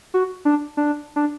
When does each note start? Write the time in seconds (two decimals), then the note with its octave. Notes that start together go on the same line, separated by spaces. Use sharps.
0.14 F#4
0.45 D4
0.77 D4
1.16 D4